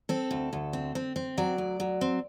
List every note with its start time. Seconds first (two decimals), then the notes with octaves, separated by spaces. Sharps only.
0.09 C4 A4
0.31 D2
0.53 D2
0.73 C4
0.95 C4
1.16 C4
1.38 F#3 D5
1.58 D2
1.80 F#3
2.01 C4